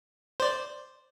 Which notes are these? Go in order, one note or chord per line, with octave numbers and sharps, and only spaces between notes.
C5 D5